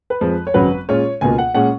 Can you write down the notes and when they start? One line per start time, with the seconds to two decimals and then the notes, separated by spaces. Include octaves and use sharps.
0.10 B4
0.21 F2 F3 G#3
0.47 C#5
0.54 G#1 F#2 C#3 F#3 B4
0.89 A#2 G#3 C#4 F4 C#5
1.21 C#2 B2 A#3 F4 G#5
1.38 F#5
1.54 A#2 G#3 C#4 F#5